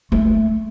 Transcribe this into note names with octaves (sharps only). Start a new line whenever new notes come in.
A3